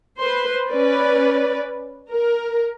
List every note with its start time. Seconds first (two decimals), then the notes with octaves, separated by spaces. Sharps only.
0.18 B4 C5 C6
0.70 C#4 B4 D5
2.12 A#4